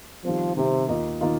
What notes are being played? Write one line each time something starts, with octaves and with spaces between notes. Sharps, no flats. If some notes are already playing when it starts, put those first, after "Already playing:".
D#3 F3 G3 C4
C3 D#3 G3 C4
D#2 D#3 A#3 F4 D#5
D#3 A#3 F4 D#5